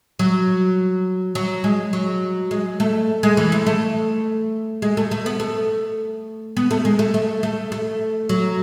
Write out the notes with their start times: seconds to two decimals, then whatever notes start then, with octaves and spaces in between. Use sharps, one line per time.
0.19 F#3
1.35 F#3
1.64 G#3
1.93 F#3
2.51 G#3
2.80 A3
3.23 G#3
3.37 E3
3.52 A3
3.67 A3
4.82 G#3
4.97 A3
5.11 A3
5.26 B3
5.40 A3
6.57 B3
6.71 A3
6.85 G#3
6.99 A3
7.14 A3
7.43 A3
7.72 A3
8.29 F#3